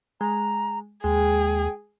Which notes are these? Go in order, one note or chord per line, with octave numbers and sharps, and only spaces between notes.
G#3 A#5
D#2 G#3 G#4 G5